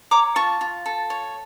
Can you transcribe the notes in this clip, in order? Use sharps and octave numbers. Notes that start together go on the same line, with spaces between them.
C#5 A#5 D6
F4 A5 C#6
F4
A4
C#5